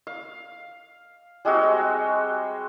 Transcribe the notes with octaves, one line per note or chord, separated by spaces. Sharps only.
F5
G3 G#3 C4 F#4